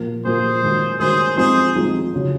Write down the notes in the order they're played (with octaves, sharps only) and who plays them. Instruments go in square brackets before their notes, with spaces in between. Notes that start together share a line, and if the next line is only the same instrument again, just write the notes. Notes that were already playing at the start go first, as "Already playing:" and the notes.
Already playing: [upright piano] A#2 F3 A#3
[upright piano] A#2 F3 A#3 [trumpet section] G#4 C5
[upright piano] F#2 D#3 G#3
[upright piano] F#2 D#3 G#3 [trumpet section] G#4 C5
[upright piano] F3 G#3 C4 D#4 [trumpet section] G#4 C5
[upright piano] F3 G#3 C4 D#4
C#3 F#3 C#4